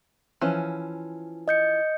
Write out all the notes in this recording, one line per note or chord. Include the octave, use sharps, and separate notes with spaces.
E3 F3 C#4
D#5 G6 C#7